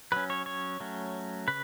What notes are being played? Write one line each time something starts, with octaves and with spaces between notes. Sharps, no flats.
F#3 C#4 B4
C#5
C#5
F#3 A3 C#4
C#3 B4